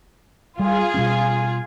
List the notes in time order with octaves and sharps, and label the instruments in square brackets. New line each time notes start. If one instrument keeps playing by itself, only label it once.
[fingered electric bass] G3 [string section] F4 G#4
[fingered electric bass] B2 G3 C#4